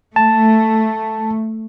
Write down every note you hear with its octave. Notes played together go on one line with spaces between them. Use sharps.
A3 A5